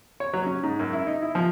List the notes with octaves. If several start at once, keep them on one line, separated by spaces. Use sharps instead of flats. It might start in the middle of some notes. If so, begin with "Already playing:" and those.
C#5
F#3
C#4
G#2
F#2
E4
D#4
E4
F3